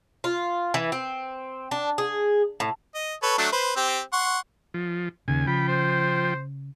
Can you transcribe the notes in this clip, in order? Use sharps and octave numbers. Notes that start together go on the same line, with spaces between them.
F4
E3
C4
D4
G#4
A2
D#5
A4 B4 C#5
F#3 A3 D4
B4 C5
C4 G4
F#5 C6 C#6
F3
D#2 C#3 G#5
F3 G5 B5
C5